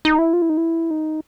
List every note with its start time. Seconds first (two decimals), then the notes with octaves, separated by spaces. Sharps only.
0.05 D#4
0.19 E4
0.33 F4
0.42 E4
0.50 D#4
0.57 E4
0.91 D#4